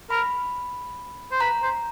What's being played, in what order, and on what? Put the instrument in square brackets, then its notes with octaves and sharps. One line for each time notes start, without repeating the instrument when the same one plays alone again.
[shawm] A#4 [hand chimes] B5
[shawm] C5
[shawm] B4 [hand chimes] A#5
[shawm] C5